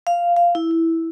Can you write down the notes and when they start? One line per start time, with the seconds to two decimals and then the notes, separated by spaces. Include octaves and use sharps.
0.07 F5
0.36 F5
0.55 E4
0.71 E4